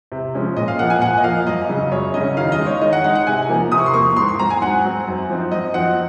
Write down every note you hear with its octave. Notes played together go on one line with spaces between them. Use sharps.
C3
F3 G#3 C#4
A#2 D#5
F5
F3 A#3 F#5
G#5
A#2 F#5
D#5
F3 A#3 F5
F#2 D#5
C#3 F#3 C#4
F#2 C#5
C#3 F#3 C#4 D#5
D#3 F5
D#5
G#3 D#4
C#5
D#3 D#5
F#5
G#3 D#4 F#5
F#5
C3 G#5
F3 A#3
C3 D#6
C#6
C6
F3 A#3 C#6
G#2 C6
C6
F#3 C4 A#5
G#5
G#2 F#5
F#3 C4
F#2
F3 C4 D#4
F#2 D#5
F3 C4 D#4 F#5